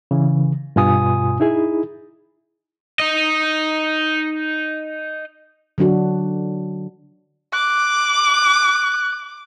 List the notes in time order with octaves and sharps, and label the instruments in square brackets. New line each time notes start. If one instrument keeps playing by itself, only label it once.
[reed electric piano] C#3 E3
G2 B2 F4 G#5 D#6
D#4 E4 G#4
[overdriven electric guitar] D#4 D#5
[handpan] D3 F#3 D4 F#4
[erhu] D6 [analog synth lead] F#6